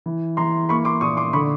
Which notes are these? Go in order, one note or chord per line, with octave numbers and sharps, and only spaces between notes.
E3
E3 A#5 C6
A#3 B5 C#6
C6 D6
A#2 C#6 D#6
C6 D6
D3 B5 C#6